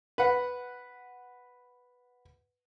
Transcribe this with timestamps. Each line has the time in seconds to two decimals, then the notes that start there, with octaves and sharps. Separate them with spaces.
0.18 B4 F#5